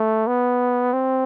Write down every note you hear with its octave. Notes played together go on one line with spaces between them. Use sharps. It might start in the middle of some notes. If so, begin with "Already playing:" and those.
Already playing: A3
B3
C4